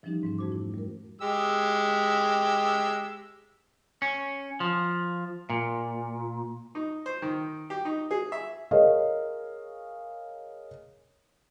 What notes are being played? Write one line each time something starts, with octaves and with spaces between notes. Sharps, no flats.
E3 F3 G3 C#4 D#4 G4
G#2 G3 C#4
F2 A3 F#4 C5 D6
E4
G3 A#4
G#3 G4 E6
C#4
F3
A#2
D#4
C5
D#3
G4
D#4
G#4
E5
G#4 A#4 C#5 D#5 F5